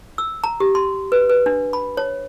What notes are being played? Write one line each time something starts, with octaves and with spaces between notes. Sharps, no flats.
E6
A#5
G4
C6
B4
B4
D4
B5
C#5